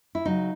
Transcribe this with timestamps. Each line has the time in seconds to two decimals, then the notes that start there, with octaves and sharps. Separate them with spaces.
0.15 E4
0.25 C#3 F#3 D#4